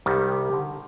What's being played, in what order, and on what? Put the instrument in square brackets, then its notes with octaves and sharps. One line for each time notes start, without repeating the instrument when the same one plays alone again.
[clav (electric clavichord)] C2 D#3 G3 [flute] G4
[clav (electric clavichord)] D3